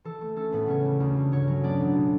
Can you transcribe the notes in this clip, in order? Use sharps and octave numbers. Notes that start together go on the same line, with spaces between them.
E3 A4
A3
C#4 A4
A2 B3 B4
C#3 C#4 C#5
G3
D2
D2
G2 C#4 C#5
F#3
B3 D4 D5
A1
B2